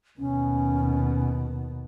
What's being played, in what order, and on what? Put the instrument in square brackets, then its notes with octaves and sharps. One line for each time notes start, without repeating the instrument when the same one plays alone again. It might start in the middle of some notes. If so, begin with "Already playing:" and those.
[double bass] D#2 B2 [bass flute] C#4